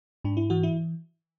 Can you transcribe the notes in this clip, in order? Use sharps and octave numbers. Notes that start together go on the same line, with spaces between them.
G#2 D4
E4
E3 F#4
E4